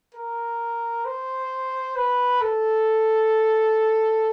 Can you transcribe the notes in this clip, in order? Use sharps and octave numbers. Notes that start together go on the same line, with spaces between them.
A#4
C5
B4
A4